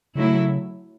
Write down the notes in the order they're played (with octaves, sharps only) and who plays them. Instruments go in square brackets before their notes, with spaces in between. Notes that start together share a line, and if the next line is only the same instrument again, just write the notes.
[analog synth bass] C#3 [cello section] F#3 A3 E4